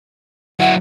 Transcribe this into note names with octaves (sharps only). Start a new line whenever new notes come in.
F#3 E4 F#5